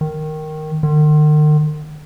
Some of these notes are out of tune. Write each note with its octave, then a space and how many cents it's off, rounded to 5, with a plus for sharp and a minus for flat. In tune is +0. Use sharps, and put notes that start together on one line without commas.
D#3 -5
D#3 -45